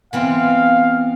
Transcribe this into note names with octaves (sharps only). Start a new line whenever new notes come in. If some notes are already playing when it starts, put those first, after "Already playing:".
E3 B3 C4 F5